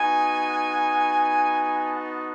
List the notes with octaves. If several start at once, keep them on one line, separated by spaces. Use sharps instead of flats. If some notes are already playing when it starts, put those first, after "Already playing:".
Already playing: B3 D#4 F#4 G#5
A5